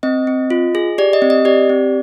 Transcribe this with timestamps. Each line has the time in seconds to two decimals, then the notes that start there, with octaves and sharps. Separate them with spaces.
0.03 C4 D#5
0.27 C4
0.50 F4
0.75 G#4
0.98 G4 D5
1.13 D#5
1.22 C4
1.30 D#5
1.45 G4 D5
1.69 C4